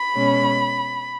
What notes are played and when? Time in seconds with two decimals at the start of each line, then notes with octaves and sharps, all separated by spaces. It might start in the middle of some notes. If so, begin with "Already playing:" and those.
Already playing: B5
0.15 B2 G#3 C#4